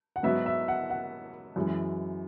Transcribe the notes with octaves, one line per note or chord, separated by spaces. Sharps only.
F#5
G#2 F#3 B3 E5
E5
F#5
F#5
F#2 E3 G#3